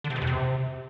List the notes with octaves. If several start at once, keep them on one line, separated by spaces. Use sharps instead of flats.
D3
C3
B2
E2
C3